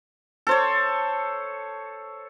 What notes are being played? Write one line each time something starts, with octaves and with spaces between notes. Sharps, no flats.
A4 C5 C#5